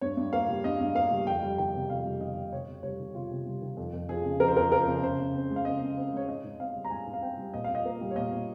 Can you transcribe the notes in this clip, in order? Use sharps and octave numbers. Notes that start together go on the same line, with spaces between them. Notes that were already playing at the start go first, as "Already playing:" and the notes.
G2 C#5
G2
A#3 F5
G3
G2 D#5
G2
A#3 F5
G3
F2 G5
G3
D#3 G5
C3
F2 F5
G3
D#3 D#5
C3
C3 C#5
C3
G3 C#5
D#3
C3 F4
C3
G3
D#3
F2
F2
F3 G#4
C#3
F2 A#4
C5
F2 A#4
F3 A#4
C#3
C#3 C5
C#3
C4
G#3
F5
C#3 D#5
C#3
C4
G#3 C#5
G#2 D#5
G#2
C4 F5
G3
A#5
G#2 G#5
G#2
F5
C4 G5
G3
A#2 D#5
F5
A#2
D#5
A#3
G3
C#5
A#2 D#5
A#2